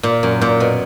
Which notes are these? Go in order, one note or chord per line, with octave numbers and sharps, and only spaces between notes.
A#2
F#2
A#2
B2